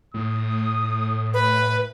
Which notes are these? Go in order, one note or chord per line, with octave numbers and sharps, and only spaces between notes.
A2 D#6
B4